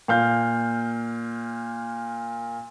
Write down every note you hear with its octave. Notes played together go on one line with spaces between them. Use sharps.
A#2 F5 G6